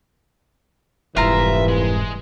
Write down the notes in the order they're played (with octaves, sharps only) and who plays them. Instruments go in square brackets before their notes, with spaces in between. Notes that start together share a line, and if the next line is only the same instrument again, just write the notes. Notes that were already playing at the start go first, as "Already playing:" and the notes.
[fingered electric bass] F1 G#2 [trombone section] C2 E3 [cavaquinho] F4 A#5 [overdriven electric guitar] E5
[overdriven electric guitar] G#3